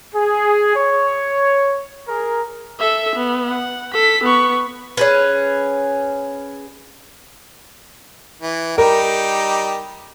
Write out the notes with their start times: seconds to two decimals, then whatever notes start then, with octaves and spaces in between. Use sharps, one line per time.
0.15 G#4
0.76 C#5
2.08 G#4 A#4
2.79 A4 E5
3.16 B3
3.49 F#5
3.94 A4 B6
4.24 B3 C#6
4.97 C#4 G#4 B4
8.42 E3
8.78 G3 D#4 G4 A#4